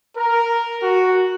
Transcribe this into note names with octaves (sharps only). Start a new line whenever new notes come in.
A#4
F#4